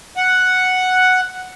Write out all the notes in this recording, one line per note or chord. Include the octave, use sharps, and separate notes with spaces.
F#5